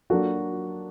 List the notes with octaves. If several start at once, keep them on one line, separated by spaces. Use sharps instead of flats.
F#3 A#3 D4 F#4 A4